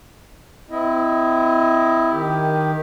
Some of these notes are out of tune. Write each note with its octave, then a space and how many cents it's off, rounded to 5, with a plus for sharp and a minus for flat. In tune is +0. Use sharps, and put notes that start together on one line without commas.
C4 -30 E4 +0 D#5 +10
D#3 +0 G4 +5